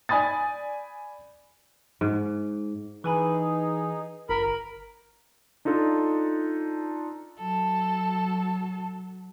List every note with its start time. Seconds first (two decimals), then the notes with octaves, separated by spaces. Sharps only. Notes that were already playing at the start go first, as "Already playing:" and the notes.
0.09 D5 G#5 B5 D#6 A6
2.01 G#2
3.04 E3 D#4 G#4 B4 G#5 B5
4.29 G1 A#4 B5
5.65 D4 D#4 F4 A4
7.38 F#3 A4 A5